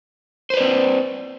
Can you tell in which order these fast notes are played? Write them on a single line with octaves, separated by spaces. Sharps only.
C5 B4 D5 C4